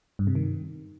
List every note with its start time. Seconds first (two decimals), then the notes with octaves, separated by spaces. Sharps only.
0.19 G2
0.27 C3
0.35 D#3